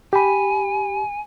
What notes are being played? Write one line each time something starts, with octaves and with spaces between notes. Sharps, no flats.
G4 G#5 B5